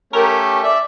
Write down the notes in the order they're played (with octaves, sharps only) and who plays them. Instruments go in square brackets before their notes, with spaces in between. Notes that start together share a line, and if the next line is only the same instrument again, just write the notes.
[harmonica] A3 C#4 G4 [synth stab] A#4
[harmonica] D5 E5